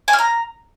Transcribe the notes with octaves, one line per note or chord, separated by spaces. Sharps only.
G#5
F6
A#5